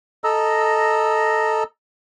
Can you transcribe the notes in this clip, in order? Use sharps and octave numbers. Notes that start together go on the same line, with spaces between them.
A4 D#5 A#5 E6